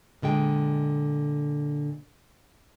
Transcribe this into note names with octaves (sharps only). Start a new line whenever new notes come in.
A#2 D3 G#3 G5